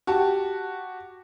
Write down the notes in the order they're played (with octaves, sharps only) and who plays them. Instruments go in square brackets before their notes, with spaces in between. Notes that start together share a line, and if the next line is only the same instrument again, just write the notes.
[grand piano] F#4 G4 A5